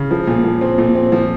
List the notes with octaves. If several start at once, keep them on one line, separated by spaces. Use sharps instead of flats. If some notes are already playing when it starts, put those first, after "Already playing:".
Already playing: C#3
F3
A#2
F3
C4
A#2
C4
F3